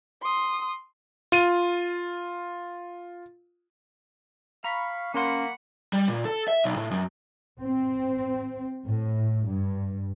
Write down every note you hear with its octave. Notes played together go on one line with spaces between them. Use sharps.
C6 D#6
F4 D#7
F5 A#5 B5 C#6 B6
A#3 C#4 A#4 F#5 C6
G3
A#2
A4
E5
B1
A2
F#2
C4
A2
G2